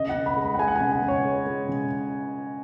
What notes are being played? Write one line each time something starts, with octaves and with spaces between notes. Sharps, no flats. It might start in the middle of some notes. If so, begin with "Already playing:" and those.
Already playing: C#3 D#5
F#5
C#3
B5
G#3
B5
F#5
G#3 G#5
F#5
C#3 G#5
F#5
C#3
C#5
G#3
G#3
C#3